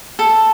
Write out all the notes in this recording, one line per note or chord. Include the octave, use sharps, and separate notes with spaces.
A4